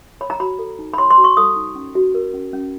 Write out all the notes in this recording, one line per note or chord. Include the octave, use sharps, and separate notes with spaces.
C#5 B5
A#5
F#4 B5
A4
D#4
B5
C#5 C6
C6
F#4
C#6
A4 D#6
D#4
C#4
F#4
A#4
C#4
C#4